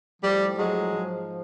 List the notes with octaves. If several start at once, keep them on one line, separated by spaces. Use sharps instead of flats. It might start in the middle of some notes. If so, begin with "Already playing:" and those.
A2 F3 G3
F#3 G#3
G#2 F3